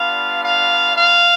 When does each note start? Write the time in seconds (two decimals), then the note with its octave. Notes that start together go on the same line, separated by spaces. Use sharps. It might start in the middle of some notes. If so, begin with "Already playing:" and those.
Already playing: G3 B3 D4 F4 F5
0.42 F5
0.94 F5